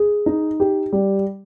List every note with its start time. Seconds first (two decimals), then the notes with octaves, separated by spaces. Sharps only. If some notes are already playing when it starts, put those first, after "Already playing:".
Already playing: G#4
0.26 D#4
0.60 G4
0.92 G3